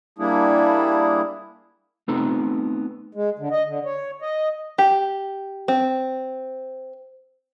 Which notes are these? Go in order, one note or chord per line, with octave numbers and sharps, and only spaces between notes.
G3 A#3 D4 E4 G#4
A3 B3 C4 D#4 A4
G#3
D3
D#5
D3
C#5
D#5
G4
C4